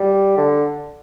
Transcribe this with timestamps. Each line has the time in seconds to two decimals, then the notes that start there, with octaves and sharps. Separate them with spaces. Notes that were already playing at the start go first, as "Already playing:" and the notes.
Already playing: G3
0.37 D3